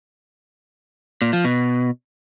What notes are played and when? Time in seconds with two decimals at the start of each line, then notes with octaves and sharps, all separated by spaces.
1.22 A#2
1.33 F3
1.44 B2